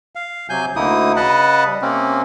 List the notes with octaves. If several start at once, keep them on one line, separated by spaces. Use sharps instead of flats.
F5
C3 F#3 G#5 G6
D2 D3 A#3 D#4 E4 D#6
C#3 B4 D#5 F#5 A5 B5
G3
C3 A#3 C4 C#4